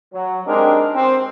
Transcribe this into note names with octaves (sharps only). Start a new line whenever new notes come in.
F#3
G#3 C4 D4 D#4 G4 A#4
C4